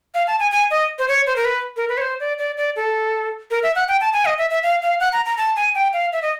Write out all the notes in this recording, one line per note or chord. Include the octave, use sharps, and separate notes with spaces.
F5
A5
G#5
G#5
D#5
C5
C#5
C5
A#4
B4
A#4
B4
C#5
C5
D5
D5
D5
A4
A#4
E5
F#5
G5
A5
G#5
D#5
E5
E5
F5
F5
F#5
A#5
A#5
A5
G#5
G5
F5
E5
D#5